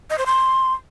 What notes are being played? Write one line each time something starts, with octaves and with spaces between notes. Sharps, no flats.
D#5
C5
C6